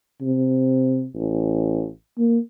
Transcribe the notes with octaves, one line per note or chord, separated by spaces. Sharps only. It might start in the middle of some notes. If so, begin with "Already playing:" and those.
C3
A1
A#3